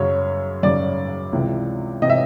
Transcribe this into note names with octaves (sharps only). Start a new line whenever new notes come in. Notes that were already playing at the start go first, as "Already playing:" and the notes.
Already playing: F#2 C#3 F#3 C#5
F#2 C#3 F#3 D5
C#2 C3 E3
C3 E3 D#5
E5